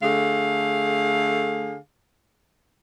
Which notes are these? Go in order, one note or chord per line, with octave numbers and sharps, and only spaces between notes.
D3 A3 G#4 F5